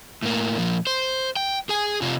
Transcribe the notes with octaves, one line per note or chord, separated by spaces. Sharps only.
A2 A#3
A#2 F3
C5
G5
G#4 G#5
C3 F4